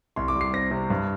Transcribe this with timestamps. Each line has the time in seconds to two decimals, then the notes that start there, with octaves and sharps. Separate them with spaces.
0.16 C2 C6
0.28 D6
0.35 G3
0.41 C7
0.54 C4 A#6
0.71 C3
0.90 G2